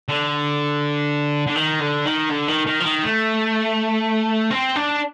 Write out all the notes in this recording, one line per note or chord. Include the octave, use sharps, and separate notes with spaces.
D3
D3
D#3
D3
D#3
D3
D#3
D#3
F3
D#3
A3
C4
D4